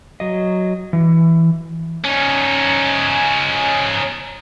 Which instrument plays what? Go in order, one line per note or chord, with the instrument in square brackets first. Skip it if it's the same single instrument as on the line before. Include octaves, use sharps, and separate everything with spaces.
[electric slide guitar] F#3 D#5
E3
[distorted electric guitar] C#4 D#4